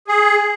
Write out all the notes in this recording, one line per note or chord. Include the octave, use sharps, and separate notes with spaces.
G#4